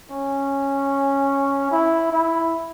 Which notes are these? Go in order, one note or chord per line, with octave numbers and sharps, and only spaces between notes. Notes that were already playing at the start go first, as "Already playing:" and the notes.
C#4
E4
E4